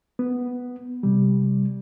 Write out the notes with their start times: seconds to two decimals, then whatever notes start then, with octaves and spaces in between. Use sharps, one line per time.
0.19 B3
1.03 C3 G3